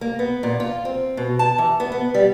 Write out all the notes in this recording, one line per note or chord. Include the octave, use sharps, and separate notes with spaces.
A#3
B3
A#2
F4
C4
B2
A5
E3
B3
B3
G3